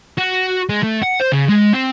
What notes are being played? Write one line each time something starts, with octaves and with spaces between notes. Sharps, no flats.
F#4
G#3
A3
F#5
C5
C#3
G#3
C4